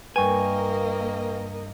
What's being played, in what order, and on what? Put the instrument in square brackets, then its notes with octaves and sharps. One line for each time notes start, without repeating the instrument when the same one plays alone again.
[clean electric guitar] G2 G#5 [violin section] A#3 D#5 [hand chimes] B4 G5 C#6